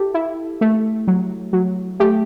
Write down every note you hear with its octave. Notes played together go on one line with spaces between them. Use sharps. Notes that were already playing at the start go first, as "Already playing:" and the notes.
Already playing: E4 G4 A4
E4
A3
F#3
F#3
A3 G4